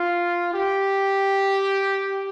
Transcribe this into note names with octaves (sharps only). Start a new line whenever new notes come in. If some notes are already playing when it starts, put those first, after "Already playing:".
Already playing: F4
G4